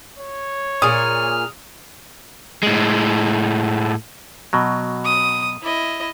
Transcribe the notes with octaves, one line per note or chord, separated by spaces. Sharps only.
C#5
A#2 G#4 D#6 F6
A2 G#3
B2 F#3
D#6
E4 D#5